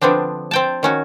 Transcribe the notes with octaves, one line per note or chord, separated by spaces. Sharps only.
D3 F3 B3 C4 D4
C4 G5 A5
D#3 C#4 F#4